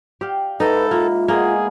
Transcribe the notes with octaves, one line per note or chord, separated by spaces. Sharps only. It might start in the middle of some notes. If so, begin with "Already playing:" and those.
G4 D5 F5 G5
G#2 D#4 E4 A4 B4
A#3 F4
B2 G#3 A#3 G#4